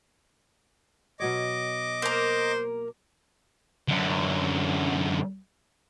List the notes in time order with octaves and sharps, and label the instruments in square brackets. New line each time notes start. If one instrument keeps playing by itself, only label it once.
[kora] B2 F#3 C#5 [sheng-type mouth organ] D#5 D6
[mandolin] A#3 A#4 [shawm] C5
[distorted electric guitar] F#2 D3